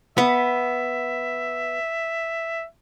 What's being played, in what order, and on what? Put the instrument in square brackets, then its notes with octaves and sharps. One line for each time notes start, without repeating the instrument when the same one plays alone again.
[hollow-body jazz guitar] B3 [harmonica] E5